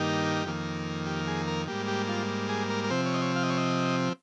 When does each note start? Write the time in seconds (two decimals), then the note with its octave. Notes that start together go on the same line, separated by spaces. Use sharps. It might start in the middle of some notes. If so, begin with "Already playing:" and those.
Already playing: G2 D#3 A#3 D#4 G4
0.45 F2 D#3 A#3
1.06 G4
1.27 G#4
1.48 A#4
1.68 G#2 G3 A#3 G4
1.88 G4
2.09 F4
2.49 G#4
2.70 A#4
2.84 A#4
2.90 C3 F3 C4 C5
3.06 C#5
3.14 D#5
3.22 C#5
3.36 F5
3.43 D#5
3.50 C#5
3.58 D#5